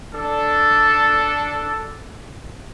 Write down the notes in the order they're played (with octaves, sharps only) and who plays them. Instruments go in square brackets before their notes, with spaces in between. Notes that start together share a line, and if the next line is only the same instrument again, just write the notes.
[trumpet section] D4 A4